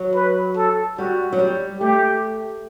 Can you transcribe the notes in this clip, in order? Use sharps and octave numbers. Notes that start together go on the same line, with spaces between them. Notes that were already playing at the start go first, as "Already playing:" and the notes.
Already playing: F#3
B4
A4
G3 F#4
F#3
G3
A3 G4